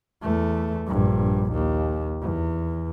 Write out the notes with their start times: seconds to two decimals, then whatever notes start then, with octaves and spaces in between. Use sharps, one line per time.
0.23 E2 A3
0.86 A#1 G2
1.52 D#2
2.22 E2